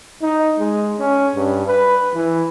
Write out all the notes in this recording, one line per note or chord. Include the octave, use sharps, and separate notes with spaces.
D#4
G#3
C#4
G2
B4
E3